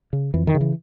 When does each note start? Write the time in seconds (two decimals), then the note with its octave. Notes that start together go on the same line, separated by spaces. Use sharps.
0.13 C#3
0.34 F2 E3
0.47 D#3
0.55 C#3
0.61 E3